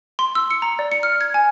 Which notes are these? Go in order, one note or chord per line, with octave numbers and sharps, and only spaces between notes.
C6
E6
C#7
A#5
D5
C#7
F6
G#6
G#5